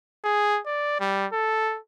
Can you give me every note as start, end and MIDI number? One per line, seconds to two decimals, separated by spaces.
0.24 0.60 68
0.66 0.96 74
1.00 1.26 55
1.33 1.78 69